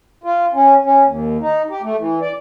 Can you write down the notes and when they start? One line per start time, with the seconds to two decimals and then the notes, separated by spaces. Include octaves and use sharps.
0.24 F4
0.54 C#4
0.85 C#4
1.05 D#2
1.41 D#4
1.70 G4
1.82 A3
1.98 E3
2.21 D5